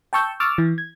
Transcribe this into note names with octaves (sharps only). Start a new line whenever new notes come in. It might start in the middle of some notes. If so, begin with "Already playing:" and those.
G5 A5 C#6 E6 G6
C#6 D6 E6 F6 A6
E3
G#6